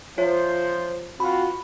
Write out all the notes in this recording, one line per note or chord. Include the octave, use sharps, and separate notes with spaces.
F3 F4 C5 C#5 E5
C4 F4 F#4 B5